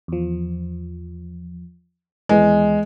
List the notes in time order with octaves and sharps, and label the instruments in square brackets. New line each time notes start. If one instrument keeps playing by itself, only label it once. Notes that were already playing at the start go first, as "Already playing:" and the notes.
[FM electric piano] E2 F3
[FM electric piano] D#2 E3 B3 [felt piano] G#3